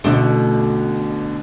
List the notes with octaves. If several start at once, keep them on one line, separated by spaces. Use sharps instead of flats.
A1 B2 D3 A3 G7